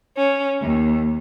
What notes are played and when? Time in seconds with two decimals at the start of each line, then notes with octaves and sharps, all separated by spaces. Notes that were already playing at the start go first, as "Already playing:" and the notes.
0.17 C#4
0.61 D#2